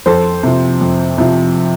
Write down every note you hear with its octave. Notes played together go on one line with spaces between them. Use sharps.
F2 A4 C5
C3 F3
F2
C3 F3